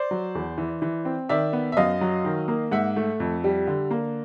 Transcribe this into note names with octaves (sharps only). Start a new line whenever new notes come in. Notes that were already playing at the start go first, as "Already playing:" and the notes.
Already playing: C5 D5
F#3
E2
E3
E3
C4
D#3 D5 E5
B3
E5
F#2 D#5 F5
F#3
D#3
A#3
G#2 E5 F#5
A3
F2
G3
D3
A#3